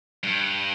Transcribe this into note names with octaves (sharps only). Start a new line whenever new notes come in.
G2